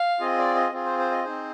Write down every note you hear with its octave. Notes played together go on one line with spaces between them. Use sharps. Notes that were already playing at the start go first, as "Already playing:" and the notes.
Already playing: F5
C4 F4 G#4 D#5
D5
D#5
C4 F4 G#4
C5
C5
D#5
C4 D#4 G#4 C5